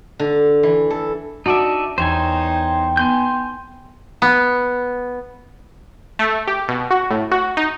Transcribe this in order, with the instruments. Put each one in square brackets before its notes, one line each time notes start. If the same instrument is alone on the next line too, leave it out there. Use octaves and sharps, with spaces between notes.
[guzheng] D3
E3
A4
[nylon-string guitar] D4 F#4 [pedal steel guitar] D#4 D5 E5 [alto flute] A5
[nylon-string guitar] E2 [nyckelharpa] D#4 [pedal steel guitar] C5 C#5 G#5 [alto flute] G5
[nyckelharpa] B3 [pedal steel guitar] G#5 C6 G6
[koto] B3
[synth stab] A3
G4
B2
F#4
A2
F#4
D#4